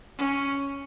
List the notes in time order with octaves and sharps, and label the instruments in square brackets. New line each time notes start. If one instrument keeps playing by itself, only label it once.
[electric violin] C#4